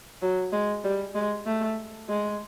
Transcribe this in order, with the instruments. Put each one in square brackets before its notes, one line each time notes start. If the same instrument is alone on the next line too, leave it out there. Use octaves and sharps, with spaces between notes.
[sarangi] F#3
G#3
G3
G#3
A3
G#3